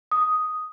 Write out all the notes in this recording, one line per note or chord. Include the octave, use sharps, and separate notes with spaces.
D#6